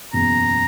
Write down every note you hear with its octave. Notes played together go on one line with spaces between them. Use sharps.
F#1 E2 B2 A#5